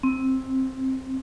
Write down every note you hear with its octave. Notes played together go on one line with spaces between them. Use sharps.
C4